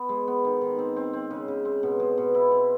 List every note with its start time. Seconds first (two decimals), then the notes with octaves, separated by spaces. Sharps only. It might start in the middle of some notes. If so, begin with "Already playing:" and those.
Already playing: B3
0.09 G#3
0.28 B3
0.45 D#3
0.61 D#3
0.78 C4
0.96 C4
1.13 C4
1.30 C#3
1.48 C#3
1.65 C4
1.83 B2
1.99 G#3
2.18 B2
2.34 E4
2.51 C4